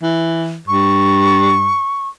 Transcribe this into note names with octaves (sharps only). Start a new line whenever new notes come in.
E3
G2 C#6